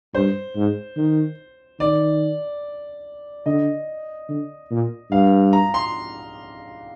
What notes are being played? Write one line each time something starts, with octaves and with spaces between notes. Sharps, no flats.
G2 C5
G#2
D#3
D#3 D5
D3 D#5
D3
A#2
G2 F5
A#5
C6